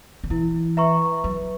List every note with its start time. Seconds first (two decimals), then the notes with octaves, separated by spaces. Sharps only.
0.24 D3
0.30 E3 E4
0.77 B4 E5 A#5 C#6
1.24 F#3 B4